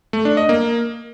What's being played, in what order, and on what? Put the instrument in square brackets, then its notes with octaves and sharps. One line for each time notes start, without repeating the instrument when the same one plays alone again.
[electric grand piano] A3
D4
D#5
A#3